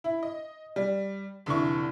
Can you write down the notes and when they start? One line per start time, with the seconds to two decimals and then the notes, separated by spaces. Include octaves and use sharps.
0.04 E4
0.23 D#5
0.76 G3
1.46 F1 D3 E3 C#6